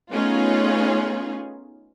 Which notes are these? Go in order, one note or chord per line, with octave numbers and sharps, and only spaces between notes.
A3 B3 C#4 D#4 F4 G#4